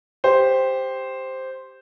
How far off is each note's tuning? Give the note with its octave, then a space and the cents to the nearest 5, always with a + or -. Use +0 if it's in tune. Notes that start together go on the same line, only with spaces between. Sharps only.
G4 +5 C5 +0